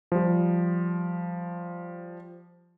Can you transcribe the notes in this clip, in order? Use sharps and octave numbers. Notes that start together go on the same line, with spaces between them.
F3 G3